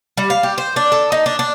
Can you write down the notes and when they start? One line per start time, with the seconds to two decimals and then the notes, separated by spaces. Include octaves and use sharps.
0.17 G3
0.30 F5
0.43 G4
0.58 C5
0.76 D4
0.92 A4
1.12 D#4
1.26 D4
1.39 D4